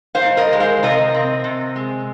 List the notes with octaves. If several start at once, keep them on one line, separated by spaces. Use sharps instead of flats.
C5 F5
G#2
A#4 D#5
G#3
C5 F5
C3 A#4 D#5
C4
C3
G#3